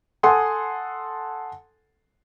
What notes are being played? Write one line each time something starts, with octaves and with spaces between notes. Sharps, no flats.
A4 F#5 G#5 C6 D#6